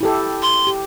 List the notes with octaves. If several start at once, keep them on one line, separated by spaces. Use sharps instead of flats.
E4 G4 A4
C6
G4